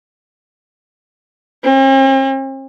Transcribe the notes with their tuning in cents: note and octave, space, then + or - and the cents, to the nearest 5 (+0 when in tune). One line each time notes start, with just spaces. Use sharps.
C4 +45